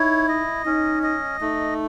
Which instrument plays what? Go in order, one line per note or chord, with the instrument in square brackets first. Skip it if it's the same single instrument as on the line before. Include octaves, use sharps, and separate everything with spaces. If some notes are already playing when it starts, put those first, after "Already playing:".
Already playing: [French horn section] D#4 [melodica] E4 C#5
[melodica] D#5
[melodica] C#4 [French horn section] D#4
[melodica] D#5
[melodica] A3 [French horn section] D#4